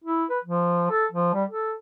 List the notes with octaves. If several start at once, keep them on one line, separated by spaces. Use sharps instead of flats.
E4
B4
F3
A4
F3
G3
A4